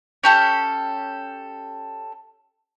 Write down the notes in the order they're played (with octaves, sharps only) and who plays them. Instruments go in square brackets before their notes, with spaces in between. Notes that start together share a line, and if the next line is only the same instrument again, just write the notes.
[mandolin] C#4 G4 A4